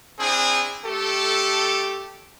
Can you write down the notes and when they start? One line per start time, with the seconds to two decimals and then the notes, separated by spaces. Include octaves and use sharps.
0.19 C4 D4 E4 G#4
0.85 A3 G4 A4